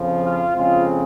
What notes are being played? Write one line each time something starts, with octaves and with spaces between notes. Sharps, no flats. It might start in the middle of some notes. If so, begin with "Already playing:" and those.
Already playing: F2 C#3 F3
F4
F2 C#3 G#3 C4 F4